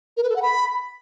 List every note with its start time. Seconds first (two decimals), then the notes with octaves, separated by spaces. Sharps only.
0.17 A#4
0.23 B4
0.30 A4
0.36 F#5
0.42 B5